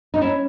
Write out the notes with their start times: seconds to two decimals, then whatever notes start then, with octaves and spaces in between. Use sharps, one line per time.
0.14 D#4
0.21 C#4 E4